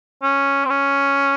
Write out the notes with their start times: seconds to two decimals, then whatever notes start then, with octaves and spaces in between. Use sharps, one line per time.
0.23 C#4
0.65 C4
0.70 C#4